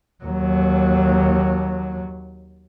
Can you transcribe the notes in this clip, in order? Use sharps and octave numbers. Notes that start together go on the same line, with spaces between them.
D#2 F#3